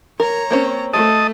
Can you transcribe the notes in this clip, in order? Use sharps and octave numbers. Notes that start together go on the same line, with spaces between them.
A#4 C#5 A#5
A#3 C4 C#4
A3 A4 D#5 A5 D#6